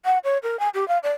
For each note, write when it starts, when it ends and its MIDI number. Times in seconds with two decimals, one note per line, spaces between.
0.05 0.18 78
0.24 0.38 73
0.43 0.59 70
0.59 0.69 80
0.74 0.87 67
0.88 0.98 77
1.03 1.12 74